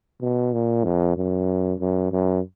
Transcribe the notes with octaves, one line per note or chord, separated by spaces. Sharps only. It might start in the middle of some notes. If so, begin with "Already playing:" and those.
B2
A#2
F2
F#2
F#2
F#2